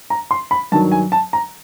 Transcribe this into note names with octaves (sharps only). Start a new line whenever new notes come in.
A#5
C6
B5
G2 D#3 F#3 A5
G#5
A5
A#5